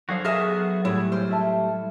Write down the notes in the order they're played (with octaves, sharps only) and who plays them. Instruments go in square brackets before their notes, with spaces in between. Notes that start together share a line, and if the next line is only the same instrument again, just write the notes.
[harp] F#3 A4 [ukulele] D4 C5 [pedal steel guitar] F#4 G#4 F5
[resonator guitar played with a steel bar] G#4 E5 A5 [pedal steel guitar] A#4 D#5 F6 [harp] B6
[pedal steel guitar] B3 F#4 F#5
[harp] A2 [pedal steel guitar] G3 A3 [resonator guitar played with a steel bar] E4 [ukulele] G#4 C#5
[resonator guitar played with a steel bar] C5 [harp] F6 D7
[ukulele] E4 E5 A5